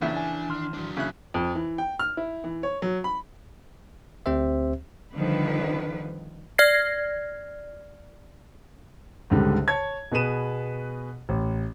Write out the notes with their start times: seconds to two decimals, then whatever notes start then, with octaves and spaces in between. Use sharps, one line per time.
0.01 A#1 C#3 E3 D4 E4
0.17 G#5
0.49 D#3 C6 F6
0.74 F#3 D4
0.97 C#3 E4 F#6
1.34 F2
1.55 E3
1.78 G5
1.99 F6
2.17 E4
2.44 E3
2.63 C#5
2.82 F#3
3.04 B5
4.26 D2 C4 G4 C5 E5
5.15 F2 D3 D#3 F3 G3 B4
6.58 D5 F6 G#6 A#6 C7
9.30 C#2 G#2 D3 G3
9.68 C#5 A5 G#6
10.11 B2 B3 G#4 B4 D#7 E7
11.29 A1